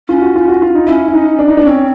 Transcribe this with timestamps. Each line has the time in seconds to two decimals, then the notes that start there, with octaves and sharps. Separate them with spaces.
0.09 C#4 F4
0.22 F#4
0.35 F4
0.48 F#4
0.62 F4
0.75 D#4
0.87 C#4 E4
1.08 E4
1.14 D#4
1.39 D4
1.48 D#4
1.57 D4
1.61 B3
1.65 C4 C#4